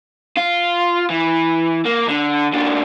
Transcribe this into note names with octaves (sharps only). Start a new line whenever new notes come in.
F4
E3
A#3
D3
D#2 D4